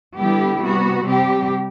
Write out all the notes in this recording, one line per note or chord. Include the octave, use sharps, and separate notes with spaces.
D3 G3 B3 E4 G4
C3 G3 B3 F#4
C3 G3 C4 G4